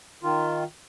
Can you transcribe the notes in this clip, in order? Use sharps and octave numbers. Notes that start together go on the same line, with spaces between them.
D#3 F4